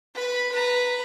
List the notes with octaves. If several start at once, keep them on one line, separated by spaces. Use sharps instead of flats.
B4 B5
B4 A#5